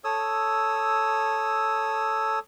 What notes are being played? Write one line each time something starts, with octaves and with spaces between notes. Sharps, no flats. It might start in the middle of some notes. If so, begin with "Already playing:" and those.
A4 C#5 D#6 E6